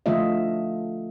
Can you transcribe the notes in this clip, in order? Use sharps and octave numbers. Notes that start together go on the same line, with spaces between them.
D3 F3 A3 F4 D#5 E5